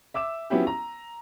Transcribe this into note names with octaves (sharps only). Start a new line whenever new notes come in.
E5 D6 E6 E7
F3 F#3 B3 C#4 E4 G4
A#5